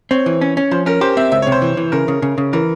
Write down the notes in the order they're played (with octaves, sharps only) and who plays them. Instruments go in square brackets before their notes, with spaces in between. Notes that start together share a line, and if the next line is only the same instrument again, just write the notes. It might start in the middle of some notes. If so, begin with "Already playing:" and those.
[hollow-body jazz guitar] C4 [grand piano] C#5
[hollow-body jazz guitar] E3
C#4
C#4
[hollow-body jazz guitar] F3 [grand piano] C5
[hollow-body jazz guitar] C#4 [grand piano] A#4
[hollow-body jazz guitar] G4 [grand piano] C5
[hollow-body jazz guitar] C4 [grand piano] E5
[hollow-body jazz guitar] C#2 [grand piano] E5
[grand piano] C#5
[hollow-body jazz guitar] C3
[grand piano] C5
[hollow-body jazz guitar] E3
E3
[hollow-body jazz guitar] C#3 [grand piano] A#4
[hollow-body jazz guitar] C#3
C#3
C#3
[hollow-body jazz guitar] E3 [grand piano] A#4